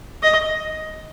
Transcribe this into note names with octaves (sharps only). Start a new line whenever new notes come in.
D#5